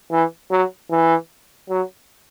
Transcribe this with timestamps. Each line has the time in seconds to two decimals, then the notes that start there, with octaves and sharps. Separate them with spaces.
0.11 E3
0.51 F#3
0.91 E3
1.69 F#3